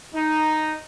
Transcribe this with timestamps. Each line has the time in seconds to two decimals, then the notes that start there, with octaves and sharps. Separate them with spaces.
0.14 D#4